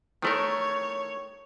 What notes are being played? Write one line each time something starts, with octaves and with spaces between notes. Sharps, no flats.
D#3 A3 A#4 C#5